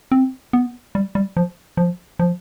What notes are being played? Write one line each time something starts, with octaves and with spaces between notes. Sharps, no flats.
C4
B3
G3
G3
F3
F3
F3